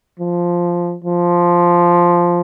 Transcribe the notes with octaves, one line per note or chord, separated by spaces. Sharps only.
F3
F3